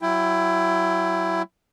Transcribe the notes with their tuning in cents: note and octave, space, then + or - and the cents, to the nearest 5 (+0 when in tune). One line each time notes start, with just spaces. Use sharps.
F#3 +15 E4 +20 G5 +20